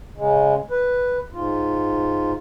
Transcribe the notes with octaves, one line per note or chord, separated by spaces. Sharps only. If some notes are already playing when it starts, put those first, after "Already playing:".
C#3 G#3
B4
G#2 F4